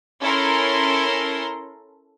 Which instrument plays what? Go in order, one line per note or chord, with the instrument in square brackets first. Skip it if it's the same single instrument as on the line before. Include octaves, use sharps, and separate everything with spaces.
[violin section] C#4 E4 A4 A#4 A#5 C6